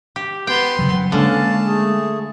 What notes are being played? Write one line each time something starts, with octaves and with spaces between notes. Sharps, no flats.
G4
B3 G5 C6
C#3 F#3
D3 G#3 A#3 C#4 F5 A5
A3 G#4